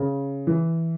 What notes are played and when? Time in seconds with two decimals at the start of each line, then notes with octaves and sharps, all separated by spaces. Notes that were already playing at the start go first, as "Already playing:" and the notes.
Already playing: C#3
0.47 E3